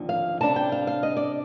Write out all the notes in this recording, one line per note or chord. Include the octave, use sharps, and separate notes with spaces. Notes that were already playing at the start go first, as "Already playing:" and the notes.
Already playing: D#2 D3 F3 C4
F5
C3 G3 D4 A5
G5
F5
F5
D#5
D5